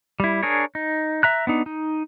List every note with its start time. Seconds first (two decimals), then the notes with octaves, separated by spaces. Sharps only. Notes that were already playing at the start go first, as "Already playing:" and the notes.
0.20 G3 E4
0.43 D4 G#4 A#4 C#5
0.75 D#4
1.23 E5 A#5 F#6
1.47 B3 D4 D#4
1.66 D#4